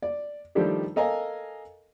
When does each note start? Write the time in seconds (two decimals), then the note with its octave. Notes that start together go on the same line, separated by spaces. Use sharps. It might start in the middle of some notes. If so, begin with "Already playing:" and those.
0.02 D5
0.55 D#3 F3 G3 A3 D4 G4
0.96 A4 A#4 D#5 F5 G#5 A#5